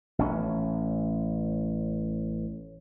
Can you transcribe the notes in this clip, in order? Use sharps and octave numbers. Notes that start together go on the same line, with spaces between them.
A1 C#4